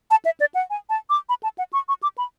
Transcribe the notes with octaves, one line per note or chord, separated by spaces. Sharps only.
A5
E5
D5
F#5
G#5
A5
D6
B5
A5
F#5
C#6
C#6
D6
B5